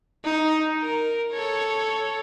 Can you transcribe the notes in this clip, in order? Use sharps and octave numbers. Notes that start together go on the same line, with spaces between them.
D#4
A#4
A4 C#5